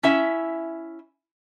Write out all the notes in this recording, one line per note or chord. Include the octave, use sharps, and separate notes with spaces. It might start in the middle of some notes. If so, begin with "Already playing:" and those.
C#4 E4 E5